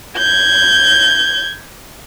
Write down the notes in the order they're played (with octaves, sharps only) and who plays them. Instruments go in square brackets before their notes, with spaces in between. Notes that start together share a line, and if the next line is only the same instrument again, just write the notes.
[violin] G6 G#6